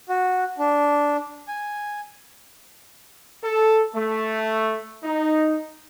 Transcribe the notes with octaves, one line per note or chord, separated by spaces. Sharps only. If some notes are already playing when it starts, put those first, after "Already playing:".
F#4
D4
G#5
A4
A3
D#4